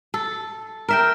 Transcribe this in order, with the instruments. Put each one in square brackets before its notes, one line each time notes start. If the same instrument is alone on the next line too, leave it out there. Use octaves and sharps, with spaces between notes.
[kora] A4
A#4 E5 G5